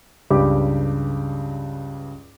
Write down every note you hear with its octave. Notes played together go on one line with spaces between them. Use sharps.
C#2 G2 G4 B5 D6